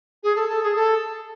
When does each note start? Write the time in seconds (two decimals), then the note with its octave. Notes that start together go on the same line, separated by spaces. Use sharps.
0.23 G#4
0.36 A4
0.49 A4
0.63 G#4
0.76 A4